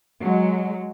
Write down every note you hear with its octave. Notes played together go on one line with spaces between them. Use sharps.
F#3 G#3